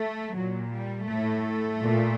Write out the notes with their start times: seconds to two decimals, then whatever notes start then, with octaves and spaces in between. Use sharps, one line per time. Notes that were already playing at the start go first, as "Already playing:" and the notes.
Already playing: A3
0.36 A#2 F#3
0.73 G3
1.08 A2 A3
1.81 A#2